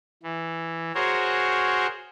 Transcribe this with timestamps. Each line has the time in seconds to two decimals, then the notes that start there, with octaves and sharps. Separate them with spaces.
0.23 E3
0.95 F#4 G#4 A#4 C5 C#5